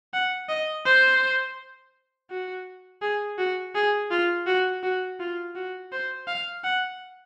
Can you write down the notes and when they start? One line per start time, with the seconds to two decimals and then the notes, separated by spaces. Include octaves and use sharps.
0.13 F#5
0.49 D#5
0.85 C5
2.30 F#4
3.02 G#4
3.38 F#4
3.75 G#4
4.11 F4
4.47 F#4
4.83 F#4
5.20 F4
5.55 F#4
5.92 C5
6.27 F5
6.64 F#5